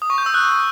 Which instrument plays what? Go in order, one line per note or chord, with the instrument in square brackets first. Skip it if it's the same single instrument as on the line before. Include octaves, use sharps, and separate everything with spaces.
[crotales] D#6
C#6
G6
E6
F#6